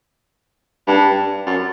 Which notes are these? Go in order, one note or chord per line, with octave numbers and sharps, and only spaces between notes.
G2
F#2